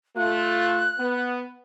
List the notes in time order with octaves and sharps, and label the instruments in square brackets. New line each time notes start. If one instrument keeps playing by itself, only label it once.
[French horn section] A3 F4 [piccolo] F#6
[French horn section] B3